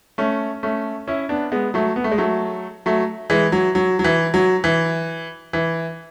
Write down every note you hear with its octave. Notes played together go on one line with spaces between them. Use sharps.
A3 C#4
A3 C#4
C#4 E4
B3 D4
G#3 B3
F#3 A3
B3
A3
G#3
F#3 A3
F#3 A3
E3 G#3
F#3
F#3
F#3
E3
F#3
E3
E3